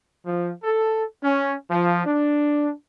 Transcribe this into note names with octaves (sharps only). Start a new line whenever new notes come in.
F3
A4
C#4
F3
D4